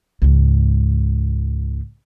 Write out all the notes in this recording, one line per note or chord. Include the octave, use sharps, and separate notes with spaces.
C#2 G#2